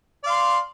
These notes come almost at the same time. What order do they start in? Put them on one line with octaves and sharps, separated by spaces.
D5 F5 C6